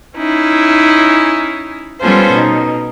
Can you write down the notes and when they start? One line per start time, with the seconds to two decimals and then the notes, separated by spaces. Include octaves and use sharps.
0.17 C#4 D#4 E4
2.01 G3 B3 C#4 F4 A4 C5
2.32 B2 D#4